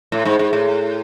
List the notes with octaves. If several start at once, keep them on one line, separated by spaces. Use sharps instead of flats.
A2
G#2
G#2
A2